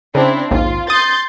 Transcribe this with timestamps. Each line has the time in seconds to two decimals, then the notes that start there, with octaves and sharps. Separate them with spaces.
0.15 C#3 C4 D4 E4
0.51 A#1 D#2 G#2 F4
0.90 C6 D#6 G6 A6